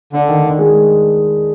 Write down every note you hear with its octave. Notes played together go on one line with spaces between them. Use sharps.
D3 D4
D#3
D4
G#3